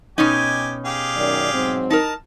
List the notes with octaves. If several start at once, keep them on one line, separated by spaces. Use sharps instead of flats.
B2 C#4 D#4 G4 G#5
G4 G#4 F5
F#2 D#3 D5
G#2 F#3 C4
D#4 A#4 A5